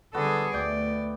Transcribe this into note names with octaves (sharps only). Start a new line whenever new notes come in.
D3 G3 B3 F#4 G#4 A4
D2 A3 D5 G5 D6